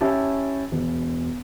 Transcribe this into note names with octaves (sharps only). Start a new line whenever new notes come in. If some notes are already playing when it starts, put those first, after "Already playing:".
C#4 E4 G4 A5
E1